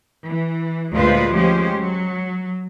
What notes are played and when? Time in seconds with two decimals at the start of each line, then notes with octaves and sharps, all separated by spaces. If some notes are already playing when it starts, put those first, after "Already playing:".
0.25 E3
0.94 D2 A#2 G#3 F4 B4 C5
1.34 F3 G#3 C#4 G4 C5
1.76 F#3